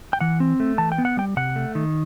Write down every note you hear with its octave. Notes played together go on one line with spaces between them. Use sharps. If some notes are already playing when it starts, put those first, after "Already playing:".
G5
E3 F#5
C4
A3
E3 A5
G5
B3
F#5
G3 G5
C3 F#5
A3
D#3